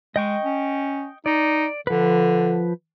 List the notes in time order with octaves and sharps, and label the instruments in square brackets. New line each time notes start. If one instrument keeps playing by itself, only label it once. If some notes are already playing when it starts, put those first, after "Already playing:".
[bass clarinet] G#3 [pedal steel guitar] D#5 G5 C#6
[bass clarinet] C#4
[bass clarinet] D#4 [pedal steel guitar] D5
[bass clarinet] D3 [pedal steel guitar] F3 B4